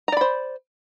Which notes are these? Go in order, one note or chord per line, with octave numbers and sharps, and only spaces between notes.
C5 D5 A#5 B5